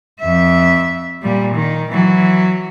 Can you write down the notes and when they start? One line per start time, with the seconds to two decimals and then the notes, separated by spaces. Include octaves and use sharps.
0.20 F2 E5
1.23 A#2 G3
1.55 D#3
1.92 E3 F#3